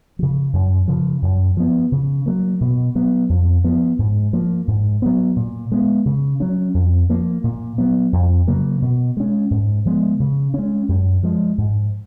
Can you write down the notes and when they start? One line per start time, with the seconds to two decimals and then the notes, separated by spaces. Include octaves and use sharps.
0.19 C#3 F3
0.53 F#2
0.88 C#3 F3
1.22 F#2
1.57 F3 B3
1.92 C#3
2.26 F#3 A#3
2.61 B2
2.95 F#3 B3
3.29 F2
3.64 F3 B3
3.99 G#2
4.33 F3 A#3
4.68 G#2
5.02 F#3 B3
5.36 A#2
5.72 G#3 B3
6.06 C#3
6.40 F#3 C#4
6.74 F2
7.09 F3 A#3
7.44 A#2
7.78 F#3 B3
8.13 F2
8.47 C#3 F#3 A#3
8.82 B2
9.17 G#3 C#4
9.51 G#2
9.85 F3 G#3 B3
10.20 C#3
10.54 G#3 C#4
10.89 F#2
11.23 F3 G#3
11.58 G#2